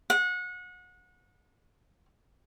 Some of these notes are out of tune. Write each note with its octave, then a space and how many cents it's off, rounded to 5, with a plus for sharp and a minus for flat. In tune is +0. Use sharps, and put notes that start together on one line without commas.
F#5 -30